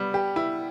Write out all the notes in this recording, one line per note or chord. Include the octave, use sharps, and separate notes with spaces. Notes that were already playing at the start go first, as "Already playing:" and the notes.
Already playing: G3 B3
G4
E4